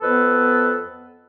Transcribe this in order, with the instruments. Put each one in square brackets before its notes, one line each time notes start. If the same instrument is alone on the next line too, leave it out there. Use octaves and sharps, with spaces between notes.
[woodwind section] F2 B3 A4 B4